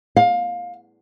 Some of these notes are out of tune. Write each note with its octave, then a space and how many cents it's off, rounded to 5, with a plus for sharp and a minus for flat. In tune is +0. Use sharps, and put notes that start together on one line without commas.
F5 +20